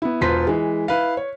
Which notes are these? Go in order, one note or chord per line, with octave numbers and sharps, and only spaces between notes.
B3 E4
E1 F4 B4 C5 C6 B6
E3 G#3
E4 B4 F5
C#5